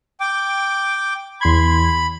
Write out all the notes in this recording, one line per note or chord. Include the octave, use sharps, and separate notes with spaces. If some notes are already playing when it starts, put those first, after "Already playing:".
G5 D6
E2 B5 C6 G#6